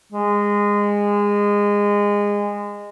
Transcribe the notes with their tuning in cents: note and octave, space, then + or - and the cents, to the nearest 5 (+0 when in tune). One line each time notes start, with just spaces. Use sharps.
G#3 -20